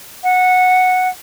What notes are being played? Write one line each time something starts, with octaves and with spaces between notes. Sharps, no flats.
F#5